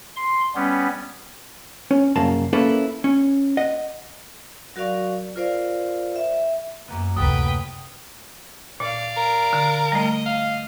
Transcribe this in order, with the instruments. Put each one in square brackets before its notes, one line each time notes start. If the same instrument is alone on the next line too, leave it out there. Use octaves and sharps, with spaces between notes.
[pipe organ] C6
G3 B3 C#4
[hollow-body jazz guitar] C#4
C2 F#2 C#3 A#3 A5
A#3 C#4 E4 A4 B4
C#4
D#5 F#5
[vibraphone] F#3 F#4 A#4 D5 F5 C#6
F4 A#4 C5 D5 F5
E5
[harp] F#2 A#3 B3
[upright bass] D2 C3 [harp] F#4 A4 [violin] B4 G5 [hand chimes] D#6
[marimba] A#2 [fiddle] D5 F5
[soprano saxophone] A#4
[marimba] D3
[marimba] G3 A3 [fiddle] D#5
[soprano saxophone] F5